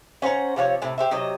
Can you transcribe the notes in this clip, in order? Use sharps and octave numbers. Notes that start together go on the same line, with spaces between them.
C#4 C5 F#5 A#5
C3 F3 F4 C#5
A2 C3
G4 C5 E5
C3 F#3 D#5